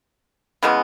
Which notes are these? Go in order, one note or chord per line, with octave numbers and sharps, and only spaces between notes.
C#3 E3 G#3 B3